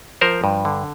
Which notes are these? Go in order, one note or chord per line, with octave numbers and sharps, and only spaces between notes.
F3 A#4 C5
G2
D3